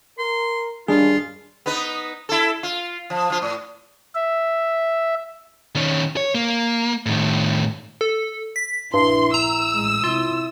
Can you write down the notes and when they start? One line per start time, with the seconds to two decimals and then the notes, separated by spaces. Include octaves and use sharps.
0.18 A#4 C6
0.88 C#2 G2 D#3 D4 F4 G#4
1.66 B3 D#4 B4
2.29 E4 A4
2.63 F4
3.10 F3
3.30 F3 F4
3.42 A2
4.15 E5
5.75 D#3 C#4
6.17 C#5
6.35 A#3
7.06 A2 D#3
8.01 A4
8.56 B6
8.94 A#1 G2 E4 C6
9.34 A#5 E6
9.74 A1 G#3
10.04 C3 E4 F4